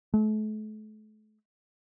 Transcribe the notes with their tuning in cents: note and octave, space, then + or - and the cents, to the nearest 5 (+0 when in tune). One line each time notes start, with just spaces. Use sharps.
A3 -40